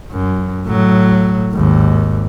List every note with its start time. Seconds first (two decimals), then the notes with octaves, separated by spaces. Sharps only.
0.12 F#2
0.66 A2 F#3
1.53 G#1 D#2